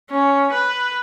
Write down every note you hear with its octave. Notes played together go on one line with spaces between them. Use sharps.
C#4
B4